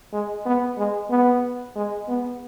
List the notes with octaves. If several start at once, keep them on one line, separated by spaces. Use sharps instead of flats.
G#3
B3
G#3
B3
G#3
B3